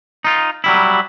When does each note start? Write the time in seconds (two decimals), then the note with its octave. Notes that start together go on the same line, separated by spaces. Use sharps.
0.25 D#4 F4
0.64 F#3 G3 E4